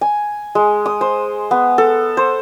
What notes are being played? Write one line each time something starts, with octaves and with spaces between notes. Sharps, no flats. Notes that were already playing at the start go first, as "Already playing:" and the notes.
G#5
G#3
D#6
C5
B3
A4
C5